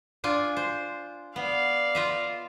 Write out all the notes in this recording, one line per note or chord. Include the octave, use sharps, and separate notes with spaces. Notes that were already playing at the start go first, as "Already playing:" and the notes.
D4 F4 G#5
C5
B3 D5 F5
F4 D#5 E5